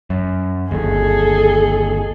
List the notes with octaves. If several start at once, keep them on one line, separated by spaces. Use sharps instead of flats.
F#2
G1 D#2 G#4 A4